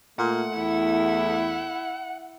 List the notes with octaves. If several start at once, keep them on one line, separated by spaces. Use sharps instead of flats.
A#2 A3 F#5
E2 E4